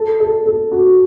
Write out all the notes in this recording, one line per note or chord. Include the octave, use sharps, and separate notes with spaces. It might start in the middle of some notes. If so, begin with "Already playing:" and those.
Already playing: A4
A4
A4
F#4